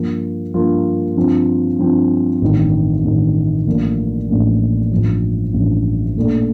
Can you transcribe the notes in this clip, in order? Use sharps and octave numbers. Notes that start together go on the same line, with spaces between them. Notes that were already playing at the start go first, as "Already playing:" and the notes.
Already playing: G2 F3 A#3 F4
G2 F3 A#3 F4
G2 F3 C4 F4
G2 F3 C4 F4
A1 G2 D#3
A1 G2 D#3
A1 A2 F3 A#3 D4
A1 A2 F3 A#3 D4
A1 G2 F3
A1 G2 F3
A#2 A3 D4